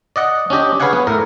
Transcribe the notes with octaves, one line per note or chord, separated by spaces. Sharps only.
D5 D#5 F#5
C#4 D4 G4 D#5
G#4 B4 C#5 F5 F#5 G#5
B3
A2 A#4